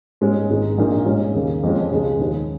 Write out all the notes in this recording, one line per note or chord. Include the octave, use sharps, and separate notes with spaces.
G#2 G#3 C#4
G#1 G#2 G#3 D#4
A#1 A#2 A#3 D#4
G#2 G#3 C#4
D#2 C#3 A#3
F2 F3 G#3 C#4
C#2 C#3 G#3
D#2 D#3 C#4